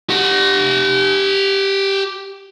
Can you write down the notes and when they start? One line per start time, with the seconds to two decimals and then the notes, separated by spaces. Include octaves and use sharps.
0.10 G4 F#5